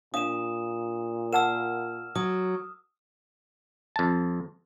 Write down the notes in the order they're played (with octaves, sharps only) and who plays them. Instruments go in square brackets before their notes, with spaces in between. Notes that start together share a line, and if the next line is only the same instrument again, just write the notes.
[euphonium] A#2 [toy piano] D4 F5 [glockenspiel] D#6 E7
[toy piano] A#4 F#5 A5 [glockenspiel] E6 F6 E7
[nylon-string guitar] F#3 [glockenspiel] D#6
[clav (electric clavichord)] F2 A5